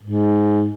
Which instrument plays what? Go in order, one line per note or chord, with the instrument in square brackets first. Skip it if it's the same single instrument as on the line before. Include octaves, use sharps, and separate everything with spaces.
[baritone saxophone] G#2